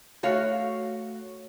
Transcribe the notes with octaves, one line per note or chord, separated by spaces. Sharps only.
A3 F#4 C#5 F5